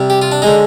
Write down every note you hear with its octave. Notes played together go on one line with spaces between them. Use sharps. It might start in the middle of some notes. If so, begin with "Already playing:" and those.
Already playing: C3 G3
G4
F4
D4
D3 G#3 D#4